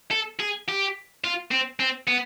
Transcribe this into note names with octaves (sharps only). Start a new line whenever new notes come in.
A4
G#4
G4
F4
C4
C4
B3